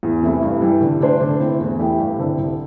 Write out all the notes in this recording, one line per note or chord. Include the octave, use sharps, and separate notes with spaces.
E2
C3 E3 A3 E4
G2
E3 G3
D3
A3 D4 C5
D3
A3 C4 E4
E2
E3 A3 E4 G4
G2
D3 C4 E4 A4
C2